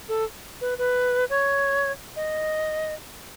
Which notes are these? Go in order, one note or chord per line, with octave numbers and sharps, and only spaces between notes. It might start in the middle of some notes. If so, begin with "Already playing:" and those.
A4
B4
B4
C#5
D#5